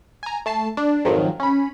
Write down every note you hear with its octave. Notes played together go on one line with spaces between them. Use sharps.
G#5 A#5
A3 A5 C7
D4
F2 G#2 D#3 F3 F#3
C#4 B5